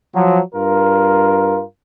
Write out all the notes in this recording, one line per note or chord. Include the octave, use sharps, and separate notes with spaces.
F3 F#3
G2 F4 A#4